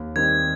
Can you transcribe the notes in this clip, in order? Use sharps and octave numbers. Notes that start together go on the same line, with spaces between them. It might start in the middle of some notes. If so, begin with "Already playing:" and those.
Already playing: D#2
D#3 G3 C4 D#4 G#6